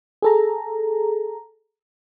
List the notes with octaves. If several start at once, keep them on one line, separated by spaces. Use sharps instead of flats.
G#4 A4 A#5